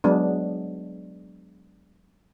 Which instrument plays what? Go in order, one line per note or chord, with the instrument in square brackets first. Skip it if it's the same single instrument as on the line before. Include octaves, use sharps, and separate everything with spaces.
[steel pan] F#3 G#3 B3 D4